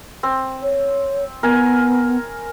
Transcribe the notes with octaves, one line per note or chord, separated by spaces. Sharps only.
C4
C#5
B3 A#4 G#5